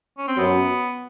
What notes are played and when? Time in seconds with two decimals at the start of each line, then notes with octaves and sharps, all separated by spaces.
0.17 C#4
0.27 C4
0.37 F#2 F#3 B3